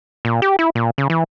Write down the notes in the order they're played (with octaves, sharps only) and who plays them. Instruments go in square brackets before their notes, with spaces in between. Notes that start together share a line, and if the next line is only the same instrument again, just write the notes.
[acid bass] A#2
G4
E4
A#2
C#3
E3